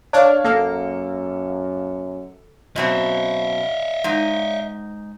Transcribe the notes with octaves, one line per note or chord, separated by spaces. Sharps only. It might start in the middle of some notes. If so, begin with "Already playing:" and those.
D4 C#5 F5
F#2 A#3 A4
F#2 B2 C4 D#5 E5
G#2 D#4